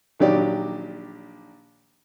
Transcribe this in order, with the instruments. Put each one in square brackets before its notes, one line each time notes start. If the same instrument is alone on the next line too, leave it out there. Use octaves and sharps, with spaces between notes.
[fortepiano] A#1 D#3 F#3 G4 D5